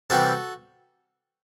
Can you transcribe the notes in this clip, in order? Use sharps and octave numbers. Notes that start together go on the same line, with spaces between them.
C3 E3 G3 F#4 A4